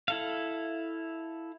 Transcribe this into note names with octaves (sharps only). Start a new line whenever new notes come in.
E4 A4 F5